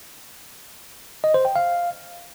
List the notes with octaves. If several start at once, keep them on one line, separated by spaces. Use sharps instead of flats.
D#5
C5
G5
F5